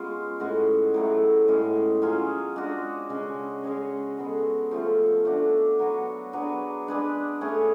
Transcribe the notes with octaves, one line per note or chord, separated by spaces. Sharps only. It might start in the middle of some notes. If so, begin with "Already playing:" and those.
Already playing: G#3 B3 C#4 F4
A2 G#3 C#4 F#4
A2 F#3 A3
A2 G#3 C#4
F#3 C#4 F4 G#4
G#3 D4 F#4
C#3 G#3 C#4
G#3 C#4 G#4 C#5
G#3 B3 F#4 A4
F3 A3 C#4 F4
A3 D4 F#4
F#3 B3 F#4 C#5
F#3 B3 D4 G#4
G#3 D4 G#4 B4
A3 C#4 G#4 C#5